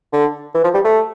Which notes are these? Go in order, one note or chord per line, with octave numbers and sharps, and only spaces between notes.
D3
E3
F3
G3
A3